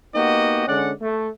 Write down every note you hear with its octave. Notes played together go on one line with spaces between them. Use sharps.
A#3 B3 D#4 F#4 G4 D#5
D3 G#3 C#4 D5 F#5
A3